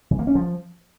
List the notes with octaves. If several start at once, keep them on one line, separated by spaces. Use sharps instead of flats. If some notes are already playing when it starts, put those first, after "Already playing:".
E3
A#3
C#4
F3